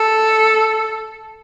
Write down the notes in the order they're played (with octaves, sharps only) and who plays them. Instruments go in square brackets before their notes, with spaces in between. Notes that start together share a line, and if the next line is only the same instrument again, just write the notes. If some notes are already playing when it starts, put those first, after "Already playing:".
Already playing: [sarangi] A4